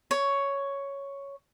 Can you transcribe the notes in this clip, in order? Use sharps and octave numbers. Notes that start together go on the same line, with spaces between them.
C#5